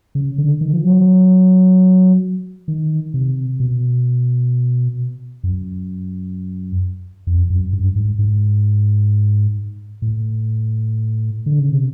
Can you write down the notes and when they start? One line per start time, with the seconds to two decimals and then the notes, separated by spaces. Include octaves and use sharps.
0.15 C#3
0.38 D3
0.61 D#3
0.73 F3
0.84 F#3
2.68 D#3
3.14 C3
3.60 B2
5.43 F#2
7.27 F2
7.50 F#2
7.73 G2
7.96 G#2
8.19 G#2
10.02 A2
11.46 D3
11.59 C#3
11.72 C3